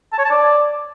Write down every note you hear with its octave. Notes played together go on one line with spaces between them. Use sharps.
A5
C#5
A5
D5